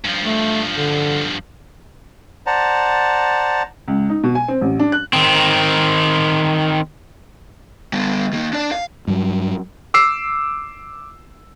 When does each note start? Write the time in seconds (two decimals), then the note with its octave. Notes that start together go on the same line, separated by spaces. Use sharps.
0.04 G2 F3
0.24 A3
0.76 D3
2.46 C5 D5 F#5 A5 A#5
3.88 C#2
4.10 D#4
4.24 B2
4.35 G#5
4.48 C4
4.61 A1
4.79 D4
4.92 F#6
5.13 D#3 C4
7.93 G3 B3
8.33 D#3 A#3
8.53 D4 D5
8.72 F5
9.07 G2 F#3
9.94 D6 E6 C7